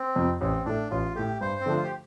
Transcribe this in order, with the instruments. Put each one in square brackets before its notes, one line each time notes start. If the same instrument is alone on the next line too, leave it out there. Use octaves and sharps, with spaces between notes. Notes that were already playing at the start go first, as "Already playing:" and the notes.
Already playing: [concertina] C4
[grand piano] F2 C3
[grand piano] A1 [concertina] C4
[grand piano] A2 A3 [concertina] D4
[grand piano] A1 [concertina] F4
[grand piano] A2 A3 [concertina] G4
[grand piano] G2 [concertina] C5
[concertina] C4
[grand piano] D3 F3 A3 [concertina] D4
[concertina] F4
G4